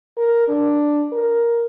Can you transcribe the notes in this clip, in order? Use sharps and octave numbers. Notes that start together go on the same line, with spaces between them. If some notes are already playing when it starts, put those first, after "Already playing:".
A#4
D4
A#4